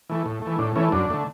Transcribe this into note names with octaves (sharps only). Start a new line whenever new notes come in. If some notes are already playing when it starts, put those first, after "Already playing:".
E3 A3
A2
E3 A3
A2 D4
E3 A3 C#4
F#2 D4
D3 A3